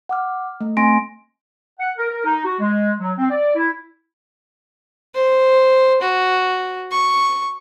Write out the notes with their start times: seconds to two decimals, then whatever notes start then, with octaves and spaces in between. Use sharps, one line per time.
0.09 F#5 D6 F6
0.61 A3
0.77 A3 C4 G#5 C6 A#6 D7
1.79 F#5
1.97 A#4
2.11 A#4
2.24 D#4
2.44 F#4
2.59 G#3
3.00 F#3
3.18 C4
3.31 D5
3.55 E4
5.15 C5
6.01 F#4
6.91 C#6